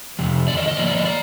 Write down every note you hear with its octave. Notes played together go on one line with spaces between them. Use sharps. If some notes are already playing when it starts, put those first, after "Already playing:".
F2 C3
C3 D#3 D5
F2 D#5
D#5
G#2 F3 A#3 D5
D5
D#5
A#3 D5